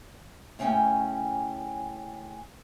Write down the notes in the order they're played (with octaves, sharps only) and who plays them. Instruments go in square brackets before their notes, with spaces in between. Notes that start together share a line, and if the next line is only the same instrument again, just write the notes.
[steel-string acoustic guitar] A2 C#3 C#4 A#4 G5 G#5